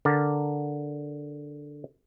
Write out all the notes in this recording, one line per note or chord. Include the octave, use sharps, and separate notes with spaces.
D3 A#4 D5